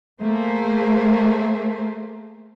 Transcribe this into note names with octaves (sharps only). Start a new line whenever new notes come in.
A3 A#3 G#4 C5